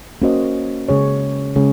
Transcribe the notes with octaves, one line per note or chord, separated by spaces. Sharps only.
A#3 C#4 F#4 C5 D#5
C#3 G#3 C#4 G#4 C#5
C#3 G#3 C#4 G#4 C#5